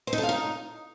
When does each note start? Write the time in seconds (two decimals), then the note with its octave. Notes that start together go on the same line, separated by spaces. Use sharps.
0.07 C5
0.13 D#4
0.18 A4
0.23 F5
0.29 D#4